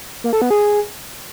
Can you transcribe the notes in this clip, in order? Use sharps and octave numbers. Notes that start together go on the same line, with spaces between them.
A#3
A4
B3
G#4